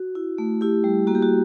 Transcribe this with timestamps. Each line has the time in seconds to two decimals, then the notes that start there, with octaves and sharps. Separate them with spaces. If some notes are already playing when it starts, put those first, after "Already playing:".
Already playing: F#4
0.15 E4
0.38 A3
0.61 E4 G4
0.84 G3
1.07 A#3 F#4
1.15 G4
1.22 F#4